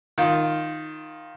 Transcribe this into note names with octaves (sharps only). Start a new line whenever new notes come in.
D#3 F4